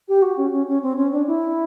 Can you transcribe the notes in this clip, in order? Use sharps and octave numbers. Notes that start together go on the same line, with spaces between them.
G4
F#4
C#4
C#4
C#4
C4
C#4
D4
E4